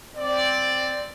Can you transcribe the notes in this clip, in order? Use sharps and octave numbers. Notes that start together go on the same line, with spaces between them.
C4 D5